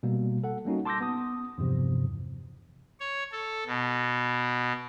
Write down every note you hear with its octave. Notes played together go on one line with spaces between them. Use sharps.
B2 G3 A#3
A4 F#5
G3 A#3 C#4 D#4 F#4
A5 C6 D6 E6 G6 A#6
B3 D#6
E2 G2 C3 F3
C#5
A4
B2